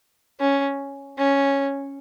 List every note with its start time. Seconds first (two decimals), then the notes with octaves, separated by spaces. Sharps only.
0.40 C#4
1.18 C#4